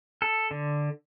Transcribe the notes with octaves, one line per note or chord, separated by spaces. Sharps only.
A4
D3